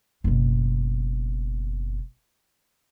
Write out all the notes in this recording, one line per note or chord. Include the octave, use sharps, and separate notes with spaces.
F#1 B2